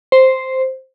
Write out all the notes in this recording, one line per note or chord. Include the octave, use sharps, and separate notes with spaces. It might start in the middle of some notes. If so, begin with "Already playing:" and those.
C5